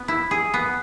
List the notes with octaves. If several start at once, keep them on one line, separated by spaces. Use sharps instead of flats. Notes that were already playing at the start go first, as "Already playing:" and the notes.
Already playing: B3
E4
G#4
B3